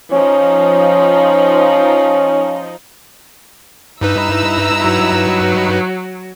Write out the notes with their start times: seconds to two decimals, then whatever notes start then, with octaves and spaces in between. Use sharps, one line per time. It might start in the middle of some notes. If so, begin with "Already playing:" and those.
0.12 F3 C#4 D#4
4.01 G2 D#4 E4 B4 A#5 E6
4.81 F#3